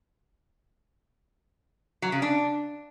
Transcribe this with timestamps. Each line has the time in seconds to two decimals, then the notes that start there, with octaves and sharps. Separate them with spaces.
2.02 F#3
2.12 C#3
2.22 D4